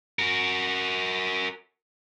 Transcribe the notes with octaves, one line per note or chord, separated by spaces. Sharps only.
F#4 A#4